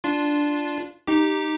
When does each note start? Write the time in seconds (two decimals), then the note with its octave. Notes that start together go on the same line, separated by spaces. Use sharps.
0.04 D4 F4
1.07 D#4 G4